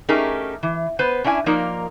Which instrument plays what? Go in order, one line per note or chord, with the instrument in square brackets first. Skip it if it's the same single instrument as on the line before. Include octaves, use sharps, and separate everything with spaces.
[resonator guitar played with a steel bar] A3 C#4 D#4 G4 G#4 A#4
E3
B3 B4 C5
C#4 D4 E4 F5 G#5
F3 A#3 D#4 A#4 D5